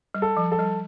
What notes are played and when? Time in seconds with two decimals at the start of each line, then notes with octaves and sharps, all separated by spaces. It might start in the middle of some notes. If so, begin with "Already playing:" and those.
0.14 G3
0.22 A4
0.37 F3
0.52 A4
0.59 G3